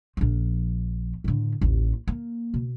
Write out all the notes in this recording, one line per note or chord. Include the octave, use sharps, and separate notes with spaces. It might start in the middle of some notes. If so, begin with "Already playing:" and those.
A#1 F3
A2 D3
A1 D#2
A#3
B2